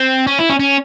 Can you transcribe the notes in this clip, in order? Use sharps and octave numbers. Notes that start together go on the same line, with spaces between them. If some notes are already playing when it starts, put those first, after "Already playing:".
Already playing: C4
C#4
E4
C#4
C#4